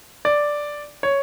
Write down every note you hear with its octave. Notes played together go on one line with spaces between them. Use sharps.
D5
C#5